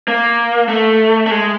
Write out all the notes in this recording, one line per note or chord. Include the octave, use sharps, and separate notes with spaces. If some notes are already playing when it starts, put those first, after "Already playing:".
A#3
A3
A3
G#3